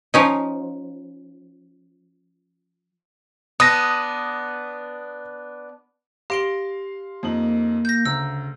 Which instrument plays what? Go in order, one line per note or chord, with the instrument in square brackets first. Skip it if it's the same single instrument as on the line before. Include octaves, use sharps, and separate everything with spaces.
[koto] F3 C#4 D#4
[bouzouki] B3 D4 [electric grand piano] D#6 A#6
[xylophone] G4 D7 G7 [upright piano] F5 C6 A#6
[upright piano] F2 D#4 F#7 [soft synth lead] A#3
[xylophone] G6 A#6
[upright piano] D2 A#5 [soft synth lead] C#3 [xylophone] E6